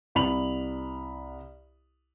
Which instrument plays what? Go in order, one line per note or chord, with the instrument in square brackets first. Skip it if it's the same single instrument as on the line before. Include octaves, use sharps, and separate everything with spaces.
[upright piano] C2 B5 F7 F#7